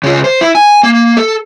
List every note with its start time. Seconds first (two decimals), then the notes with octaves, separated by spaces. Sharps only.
0.04 C#3 F4
0.24 C5
0.41 E4
0.55 G#5
0.83 A#3
1.17 A4